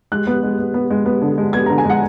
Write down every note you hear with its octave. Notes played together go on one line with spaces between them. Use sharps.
G#3 F#6
B3
G#3
B3
B3
G#3
B3
D3
G#3
B3 G#6
D3 A#5
G#5
G#3 F#5